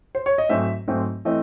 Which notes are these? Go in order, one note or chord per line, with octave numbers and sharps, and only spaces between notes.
C5
C#5
D#5
G#2 F#3 A3 C4 E5
G#2 F#3 A3 C4
E3 A3 C4 D#5